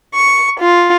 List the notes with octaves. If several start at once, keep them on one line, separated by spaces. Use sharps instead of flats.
C#6
F4